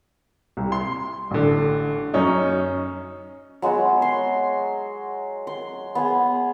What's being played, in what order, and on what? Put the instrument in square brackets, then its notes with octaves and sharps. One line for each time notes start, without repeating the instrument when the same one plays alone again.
[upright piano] C2
C6
A1 D3
F#2 C#4 D#4
[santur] F#3 G#3 B3 F#4
C6
C6
B3 G#4